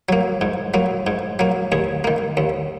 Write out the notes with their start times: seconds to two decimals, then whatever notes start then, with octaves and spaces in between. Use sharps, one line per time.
0.09 F#3 A#3
0.41 G#2
0.74 F#3 A#3
1.07 G#2
1.39 F#3 A#3
1.72 D#2 G#4
2.04 D#3 A#3
2.37 D#2